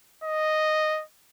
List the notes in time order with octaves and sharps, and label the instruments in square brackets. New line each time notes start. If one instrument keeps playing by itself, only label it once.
[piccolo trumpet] D#5